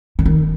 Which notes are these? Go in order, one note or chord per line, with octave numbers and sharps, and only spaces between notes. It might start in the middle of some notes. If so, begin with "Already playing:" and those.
D3
D#3